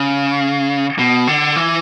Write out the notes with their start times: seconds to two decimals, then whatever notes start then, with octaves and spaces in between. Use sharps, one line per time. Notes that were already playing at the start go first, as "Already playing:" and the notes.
Already playing: C#3
0.99 B2
1.27 D3
1.56 E3